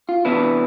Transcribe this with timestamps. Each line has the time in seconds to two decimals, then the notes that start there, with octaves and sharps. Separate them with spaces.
0.09 F4
0.25 C3 E3 B3 D4 E4